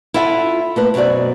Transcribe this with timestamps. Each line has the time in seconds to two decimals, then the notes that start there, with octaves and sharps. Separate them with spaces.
0.14 E4 F4 A4 E5 F#5
0.76 A3 A#3 B4
0.94 F#2 B2 C4 F#4 D5